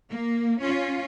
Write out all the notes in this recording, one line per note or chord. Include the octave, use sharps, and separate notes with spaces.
A#3
C#4 F4